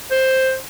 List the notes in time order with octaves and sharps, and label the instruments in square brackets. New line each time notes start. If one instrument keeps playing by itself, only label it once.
[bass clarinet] C5